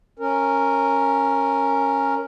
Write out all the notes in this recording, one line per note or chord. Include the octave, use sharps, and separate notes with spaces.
C#4 A#4